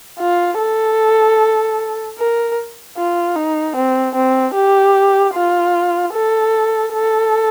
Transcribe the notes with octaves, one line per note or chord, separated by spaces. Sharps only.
F4
A4
A#4
F4
D#4
C4
C4
G4
F4
A4
A4